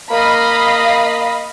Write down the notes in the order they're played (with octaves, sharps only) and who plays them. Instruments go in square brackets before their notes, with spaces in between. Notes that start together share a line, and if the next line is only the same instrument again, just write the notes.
[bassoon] A#3 [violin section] D#5 F5 B5